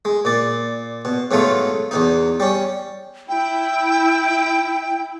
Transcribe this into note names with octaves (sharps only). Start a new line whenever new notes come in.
G#3
A#2 D5
B2
G#2 B2 F#3 A3 F4
E2 B2 D#4
G3 C#4
E4 G5